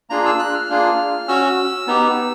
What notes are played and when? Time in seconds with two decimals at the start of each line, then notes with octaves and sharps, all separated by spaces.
0.10 A#3 D4 F4 G#4 A#5
0.25 E6
0.39 F#6
0.54 F6
0.70 A#3 D4 F4 G#4
1.28 C#4 F#4 E6
1.87 B3 D#4 G4